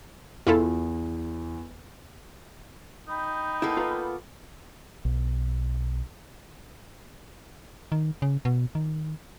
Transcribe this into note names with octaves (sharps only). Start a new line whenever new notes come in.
E2 E4 F4 A4
D#4 G5 B5 G6
A#3 B3 E4 A4
F4 B4 A#5
B1
D#3
C#3
B2
D#3